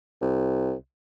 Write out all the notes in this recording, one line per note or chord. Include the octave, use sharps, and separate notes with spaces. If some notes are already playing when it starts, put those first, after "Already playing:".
C2